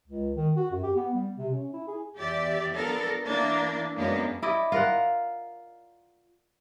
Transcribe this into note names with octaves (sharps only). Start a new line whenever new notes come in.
C#2
D#3
F#4
F#2
G4
B3
G3
C3
C#4
E4
G#4
E2 G4 D5 E5
F3 B3 D4 A4 A#4
E3 A#3 D4 E4
F#2 G#3 A#3 B3 D4
E4 D5 D#5
F4 A#4 F#5